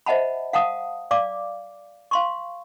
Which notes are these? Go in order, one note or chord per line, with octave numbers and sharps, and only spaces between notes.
C5 D#5 E5 F#5 A5 B5
F5 F#5 A5 D#6
D5 F5 D6
F5 C6 C#6